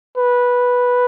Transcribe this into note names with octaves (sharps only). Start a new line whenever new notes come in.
B4